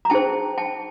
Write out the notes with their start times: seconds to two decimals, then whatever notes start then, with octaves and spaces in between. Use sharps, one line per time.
0.05 A#5
0.10 D#4 G#4 C5 G5 A5
0.58 G5 A5